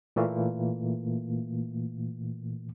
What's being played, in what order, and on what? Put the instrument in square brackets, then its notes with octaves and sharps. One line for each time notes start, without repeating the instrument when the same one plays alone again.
[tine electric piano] A#2 E3 A3 A#3